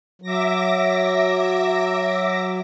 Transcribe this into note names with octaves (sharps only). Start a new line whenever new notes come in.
F#3 E5 D6 A#6